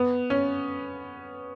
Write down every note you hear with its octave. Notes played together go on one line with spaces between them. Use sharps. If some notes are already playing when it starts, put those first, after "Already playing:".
Already playing: B3
C#4